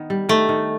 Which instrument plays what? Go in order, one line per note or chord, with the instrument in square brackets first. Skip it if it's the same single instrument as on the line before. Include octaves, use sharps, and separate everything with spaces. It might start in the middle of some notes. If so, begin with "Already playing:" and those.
Already playing: [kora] D#3 B3
G3
[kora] D#3 [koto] A3
[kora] D#3